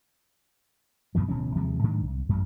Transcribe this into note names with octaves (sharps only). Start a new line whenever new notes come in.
F#2 B2 D#3 F3
D1 B2 E3 C#4
D#2 C3 F3 G#3
G#2 D#3 F#3 D4
C2
A1 F#2